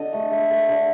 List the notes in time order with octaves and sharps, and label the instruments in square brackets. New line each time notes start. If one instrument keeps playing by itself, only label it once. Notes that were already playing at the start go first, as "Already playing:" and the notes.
Already playing: [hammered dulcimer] D3 A4 D#5
A3
A3
A3
D3